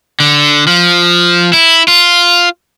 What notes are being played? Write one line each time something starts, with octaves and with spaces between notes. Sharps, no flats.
D3
F3
E4
F4